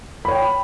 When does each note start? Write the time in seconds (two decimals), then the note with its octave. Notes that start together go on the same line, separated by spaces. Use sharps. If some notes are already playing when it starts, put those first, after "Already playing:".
0.25 B5
0.28 C#5
0.32 G5